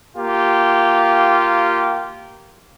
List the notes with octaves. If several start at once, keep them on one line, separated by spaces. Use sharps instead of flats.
A#3 F4 G4